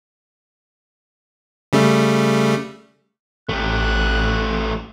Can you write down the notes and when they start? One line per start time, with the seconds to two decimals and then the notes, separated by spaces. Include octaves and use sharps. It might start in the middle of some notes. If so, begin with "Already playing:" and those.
1.73 C#3 G3 A3
3.49 A1 A3 G4 F#6